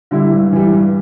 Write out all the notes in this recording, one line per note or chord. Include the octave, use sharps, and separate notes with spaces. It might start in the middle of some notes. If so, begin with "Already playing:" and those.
D3 G3 E4
G2
E3 G3
G2